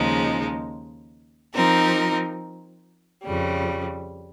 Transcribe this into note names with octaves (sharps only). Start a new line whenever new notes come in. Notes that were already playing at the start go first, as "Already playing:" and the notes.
Already playing: D#2 C#3 F3 G#3 D#4
F3 C4 D#4 A#4
F2 C#3 G3